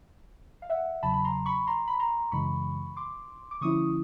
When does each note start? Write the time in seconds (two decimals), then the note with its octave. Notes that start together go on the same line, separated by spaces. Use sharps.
0.62 F5
0.70 E5 F#5
1.03 E2 C#3 F#3 A5 B5
1.14 B5
1.24 A#5 C6
1.46 B5 C#6
1.67 A#5 C6
1.88 B5
2.00 A#5 C6
2.32 F#2 C#3 E3 G#3 B5 C#6
2.96 C6 D6
3.51 D6
3.61 D3 F3 A3 C#4 E4 C#6 D#6